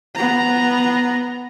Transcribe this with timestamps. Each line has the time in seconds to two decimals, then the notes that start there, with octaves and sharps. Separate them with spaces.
0.16 B3 A#5